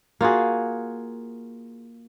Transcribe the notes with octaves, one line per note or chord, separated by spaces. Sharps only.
A#3 F4 F#4 G#4